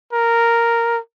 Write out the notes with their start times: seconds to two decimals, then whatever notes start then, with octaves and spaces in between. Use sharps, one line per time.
0.13 A#4